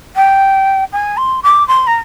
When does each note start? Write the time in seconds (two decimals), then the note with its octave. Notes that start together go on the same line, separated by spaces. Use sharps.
0.16 G5
0.92 G#5
1.17 C6
1.43 D6
1.68 C6
1.87 A#5